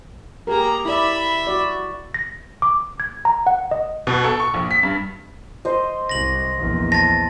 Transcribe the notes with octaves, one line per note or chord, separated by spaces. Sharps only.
A#3 G4 G#4 A#4 A#5
E4 D5 E5 B5
F#4 D5
A#6
D6
G#6
A#5
F#5
D#5
B2
A4
C#6
A#1
B6
G2
C5 D#5
C2 A#6 F#7
A#1 E2
A5 A6 A#6